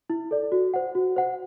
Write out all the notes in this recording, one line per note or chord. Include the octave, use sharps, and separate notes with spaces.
E4
A4 D5
F#4
C5 F#5
F#4
C5 F#5